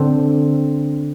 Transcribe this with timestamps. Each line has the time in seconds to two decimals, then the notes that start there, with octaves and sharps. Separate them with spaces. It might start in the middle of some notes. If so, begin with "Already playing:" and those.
Already playing: D3 C4